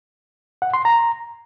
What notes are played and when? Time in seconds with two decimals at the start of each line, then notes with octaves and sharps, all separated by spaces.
0.62 F#5
0.74 C6
0.85 A#5